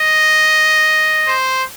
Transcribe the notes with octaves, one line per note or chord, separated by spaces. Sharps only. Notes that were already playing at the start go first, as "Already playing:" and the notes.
Already playing: D#5
C5